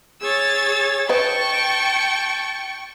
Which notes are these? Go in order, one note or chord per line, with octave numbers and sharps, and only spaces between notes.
G#4 C#5 E6 A6
B4 D#5 G5 A5 C#6